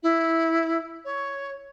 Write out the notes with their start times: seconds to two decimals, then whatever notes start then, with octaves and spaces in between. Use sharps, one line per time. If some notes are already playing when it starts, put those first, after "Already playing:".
0.03 E4
1.05 C#5